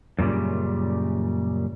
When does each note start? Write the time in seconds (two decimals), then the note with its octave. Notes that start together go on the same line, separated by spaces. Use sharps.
0.19 F#2 A#2 C#3 G3